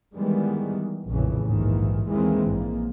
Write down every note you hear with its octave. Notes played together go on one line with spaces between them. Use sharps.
D#3 E3 G3 G#3 B3
A#1 F2 A2 C#3 E3
A#1 D#2 G#2 D#3 E3
D#2 D#3 E3 G#3 A#3 C4
A#1 G#2 A#3